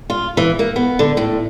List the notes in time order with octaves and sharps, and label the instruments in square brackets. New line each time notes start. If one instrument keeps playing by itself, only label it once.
[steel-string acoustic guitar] F4
E3
A#3
B3
D3
A2